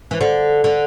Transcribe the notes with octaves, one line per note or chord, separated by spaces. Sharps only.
E3
D3
D3